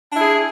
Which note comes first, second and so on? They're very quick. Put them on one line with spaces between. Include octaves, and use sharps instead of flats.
D4 E4 G#4